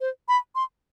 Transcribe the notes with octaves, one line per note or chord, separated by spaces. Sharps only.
C5
B5
C6